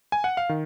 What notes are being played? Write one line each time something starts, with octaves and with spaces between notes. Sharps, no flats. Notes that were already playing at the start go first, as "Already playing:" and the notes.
G#5
F#5
F5
D#3